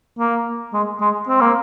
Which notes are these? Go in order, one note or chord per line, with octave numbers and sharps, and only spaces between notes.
A#3
G#3
G#3
C4
A#3